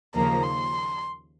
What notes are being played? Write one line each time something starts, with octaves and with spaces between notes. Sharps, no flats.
D#2 C#3 F3 A#3 A#5
C6